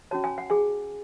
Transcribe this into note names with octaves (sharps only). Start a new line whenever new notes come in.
C#4 F#4 C#5 A5
G#5
F#5
G#4 G#5